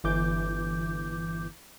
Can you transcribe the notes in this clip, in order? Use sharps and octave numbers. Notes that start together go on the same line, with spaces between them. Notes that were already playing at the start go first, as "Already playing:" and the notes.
G1 E3 D6 G6